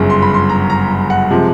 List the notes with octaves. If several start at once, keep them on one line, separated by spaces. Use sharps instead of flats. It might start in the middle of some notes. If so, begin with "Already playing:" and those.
Already playing: G1 F#2 C#3
C6
B5
C6
A#5
A#5
F#5
C3 F3 G#3